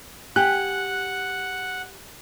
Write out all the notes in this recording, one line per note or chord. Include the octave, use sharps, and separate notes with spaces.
G4 F#5 G#5 F#6